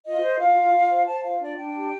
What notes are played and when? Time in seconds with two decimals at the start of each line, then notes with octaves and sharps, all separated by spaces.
0.05 F4 D#5
0.22 C5
0.39 F4 F5
0.56 F4
0.73 F4
0.90 C5
1.07 C5 A5
1.24 F4 F5
1.41 D4 D5
1.57 D4 G5
1.74 G4